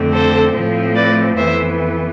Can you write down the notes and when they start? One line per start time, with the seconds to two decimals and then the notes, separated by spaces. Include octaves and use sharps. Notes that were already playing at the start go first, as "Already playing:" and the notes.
Already playing: F2 D3 A3 C4
0.12 A4 C5
0.54 A2 F3 A3 C4
0.95 B4 D5
1.37 F2 E3 B3 C5 E5